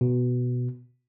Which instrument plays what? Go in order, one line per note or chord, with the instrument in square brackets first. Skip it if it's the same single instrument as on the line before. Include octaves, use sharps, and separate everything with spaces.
[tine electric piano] B2